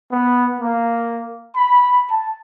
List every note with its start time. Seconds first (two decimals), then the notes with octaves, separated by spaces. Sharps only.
0.11 B3
0.60 A#3
1.55 B5
2.10 A5